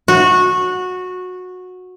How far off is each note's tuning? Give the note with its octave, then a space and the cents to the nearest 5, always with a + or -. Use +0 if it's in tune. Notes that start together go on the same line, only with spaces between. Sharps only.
F#4 -15